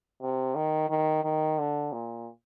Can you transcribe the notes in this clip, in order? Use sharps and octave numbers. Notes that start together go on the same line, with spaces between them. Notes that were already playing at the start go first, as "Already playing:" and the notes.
C3
D#3
D#3
D#3
D3
A#2